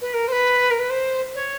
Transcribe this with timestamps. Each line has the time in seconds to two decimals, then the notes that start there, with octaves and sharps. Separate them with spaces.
0.01 B4
0.13 A#4
0.27 C5
0.32 B4
0.70 A#4
0.79 B4
0.89 C5
1.34 C#5